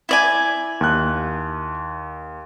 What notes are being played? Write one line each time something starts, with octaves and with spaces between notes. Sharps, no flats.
E4 D5 G#5
D#2 F#6